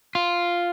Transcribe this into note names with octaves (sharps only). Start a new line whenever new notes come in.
F4